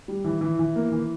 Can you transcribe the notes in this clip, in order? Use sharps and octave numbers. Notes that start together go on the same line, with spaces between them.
G3
E3
E3
E3
A#3
E3